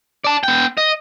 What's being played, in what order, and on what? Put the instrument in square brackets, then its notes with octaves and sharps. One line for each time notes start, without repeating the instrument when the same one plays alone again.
[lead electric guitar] D5 A5
B3 G5
D#5